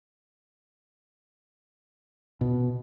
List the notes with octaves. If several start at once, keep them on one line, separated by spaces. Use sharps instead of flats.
B2